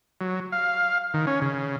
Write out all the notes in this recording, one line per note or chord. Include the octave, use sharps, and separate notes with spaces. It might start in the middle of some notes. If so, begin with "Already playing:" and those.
F#3
F5
D#3
C#4
C#3